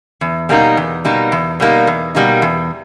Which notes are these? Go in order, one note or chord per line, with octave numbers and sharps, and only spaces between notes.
E2
B2 G3 A#3 D#4
E2
B2 G3 A#3 D#4
E2
B2 G3 A#3 D#4
E2
B2 G3 A#3 D#4
E2